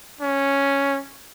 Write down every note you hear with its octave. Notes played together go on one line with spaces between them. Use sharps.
C#4